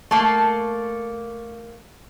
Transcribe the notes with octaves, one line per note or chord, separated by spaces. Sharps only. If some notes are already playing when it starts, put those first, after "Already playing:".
A3 A#3